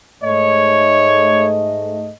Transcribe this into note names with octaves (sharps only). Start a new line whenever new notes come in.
G#2 A3 C#5 D#5